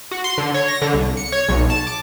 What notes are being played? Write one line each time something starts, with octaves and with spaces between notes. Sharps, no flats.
F#4
C6
D3
C#5
A#6
D3
C2
C#7
C#5
B1
A5
D6